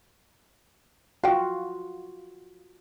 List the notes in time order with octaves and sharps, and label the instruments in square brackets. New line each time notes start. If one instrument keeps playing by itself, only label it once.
[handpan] F4 F#4 [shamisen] F5 G5